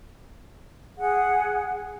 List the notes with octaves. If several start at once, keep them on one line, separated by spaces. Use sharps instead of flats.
G#4 F#5